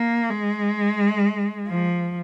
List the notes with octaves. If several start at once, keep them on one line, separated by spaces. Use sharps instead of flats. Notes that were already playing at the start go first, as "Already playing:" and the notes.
Already playing: A#3
G#3
F3